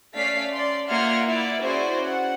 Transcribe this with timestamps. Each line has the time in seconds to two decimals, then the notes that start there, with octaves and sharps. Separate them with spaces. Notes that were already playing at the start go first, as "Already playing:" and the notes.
0.14 A3 C#4 D5 F5 B6 C7
0.53 D5 C6
0.89 A#3 F4 E5 F#5 F6 G#6
1.27 E4 D5
1.62 C#4 E4 F#4 G#4 C5 D5
2.03 F#5